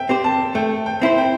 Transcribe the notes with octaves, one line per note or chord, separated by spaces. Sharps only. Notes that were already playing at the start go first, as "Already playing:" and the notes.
Already playing: E5 G5
C4 G4 C5
A5
A3 G5
G5
C4 E4 C5
G5